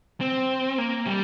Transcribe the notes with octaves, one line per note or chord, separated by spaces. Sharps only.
C4
A#3
G3